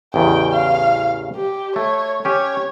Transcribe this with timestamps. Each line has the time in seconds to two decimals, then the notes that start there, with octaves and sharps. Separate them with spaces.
0.14 A1 E2 C#3 G5
0.52 F5
1.36 G4
1.76 A3 C#5
2.25 C#4 G4 C#5